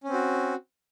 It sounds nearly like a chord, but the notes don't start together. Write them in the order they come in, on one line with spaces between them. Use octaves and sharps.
C#4 C4 F#4